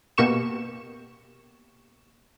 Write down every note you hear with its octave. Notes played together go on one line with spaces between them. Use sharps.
B2 A#3 G4 C#6 E7